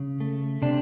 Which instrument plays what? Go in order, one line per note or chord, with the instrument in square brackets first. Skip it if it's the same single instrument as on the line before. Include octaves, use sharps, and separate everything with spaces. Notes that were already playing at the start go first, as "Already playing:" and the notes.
Already playing: [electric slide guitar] C#3
A3
C3 D4